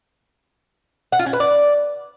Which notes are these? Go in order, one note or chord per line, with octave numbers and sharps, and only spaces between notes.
F#5
F4
C#4
B4
D5